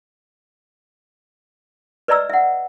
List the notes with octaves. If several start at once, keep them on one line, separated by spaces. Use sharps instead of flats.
B4 D5 D#5 A#5 E6
E5 F#5